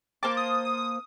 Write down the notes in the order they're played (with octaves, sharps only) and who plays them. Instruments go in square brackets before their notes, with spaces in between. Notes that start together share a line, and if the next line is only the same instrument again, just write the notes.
[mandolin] A#3 C5 A5 [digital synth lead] D6
[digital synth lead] D#6
D#6